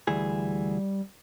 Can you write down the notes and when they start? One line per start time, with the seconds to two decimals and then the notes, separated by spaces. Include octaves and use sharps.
0.07 D2 E3 G3 G#4